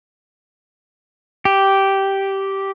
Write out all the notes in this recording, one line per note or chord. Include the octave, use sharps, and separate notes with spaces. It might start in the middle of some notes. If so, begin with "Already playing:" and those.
G4